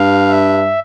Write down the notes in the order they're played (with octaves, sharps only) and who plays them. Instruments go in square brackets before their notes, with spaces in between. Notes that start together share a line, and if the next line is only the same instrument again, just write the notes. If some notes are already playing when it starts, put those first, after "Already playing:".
Already playing: [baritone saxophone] G2 [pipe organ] F5
[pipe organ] E5